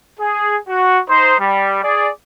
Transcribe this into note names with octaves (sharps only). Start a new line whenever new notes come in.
G#4
F#4
D#4 C5
G3
G#4 D5